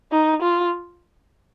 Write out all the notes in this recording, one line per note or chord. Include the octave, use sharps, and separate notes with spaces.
D#4
F4